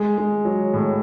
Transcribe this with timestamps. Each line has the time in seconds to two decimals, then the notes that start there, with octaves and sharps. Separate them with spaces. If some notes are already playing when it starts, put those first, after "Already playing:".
Already playing: G#3
0.18 G#3
0.45 F#3
0.74 A2